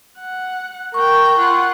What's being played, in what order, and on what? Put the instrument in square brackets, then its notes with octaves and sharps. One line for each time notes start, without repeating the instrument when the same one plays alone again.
[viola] F#5
[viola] A#4 G5 [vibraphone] C#6
[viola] F4 F#5